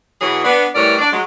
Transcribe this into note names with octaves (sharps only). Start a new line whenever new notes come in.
B2 E3 F#3 G#4 B4 C#5
B3 D4
A2 E3 G3 A#4 C#5 D5
D4 D5
F#3 G#3